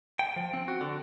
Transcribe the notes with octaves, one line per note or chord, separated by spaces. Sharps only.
G5
F3
C4
F#4
D3